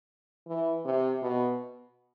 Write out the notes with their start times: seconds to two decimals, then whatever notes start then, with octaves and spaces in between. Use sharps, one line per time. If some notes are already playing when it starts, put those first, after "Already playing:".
0.48 E3
0.85 C3
1.22 B2